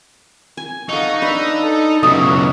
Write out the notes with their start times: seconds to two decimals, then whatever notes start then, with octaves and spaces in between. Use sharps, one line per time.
0.57 G#5
0.89 D#4 A4 F5 F#5 C#6
1.22 D4 B4 D#5 B5 E6
1.61 A4
2.03 C#2 B2 F#3 C#4 E4 C#6 D#6